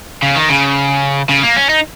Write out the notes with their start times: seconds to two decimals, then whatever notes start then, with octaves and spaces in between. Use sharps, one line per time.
0.23 C#3
0.36 D#3
0.49 C#3
1.29 C#3
1.43 A#3
1.57 C#4
1.70 D#4